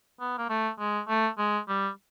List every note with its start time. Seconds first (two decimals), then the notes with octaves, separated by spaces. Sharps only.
0.20 B3
0.38 A#3
0.49 A3
0.79 G#3
1.08 A3
1.38 G#3
1.68 G3